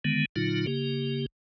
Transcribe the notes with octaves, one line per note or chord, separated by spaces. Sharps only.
D3 D#3 G#3 B3
A#2 D3 F#3 D#4 F4
C#3 A#3 G4